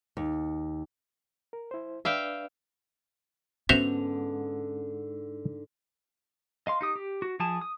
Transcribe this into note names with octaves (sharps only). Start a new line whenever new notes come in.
D#2
A#4
E4 C5
D4 B4 D5 E5 F5 G5
G#2 D3 B3 C#4 F#4 C5 E5 F7
D#5 F5 C6
D#4 G4 D#6
G4
F#4
F3 G#4 A5
D#6